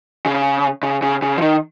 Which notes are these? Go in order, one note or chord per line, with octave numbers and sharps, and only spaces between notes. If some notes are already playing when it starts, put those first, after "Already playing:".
C#3
C#3
C#3
C#3
F3
D#3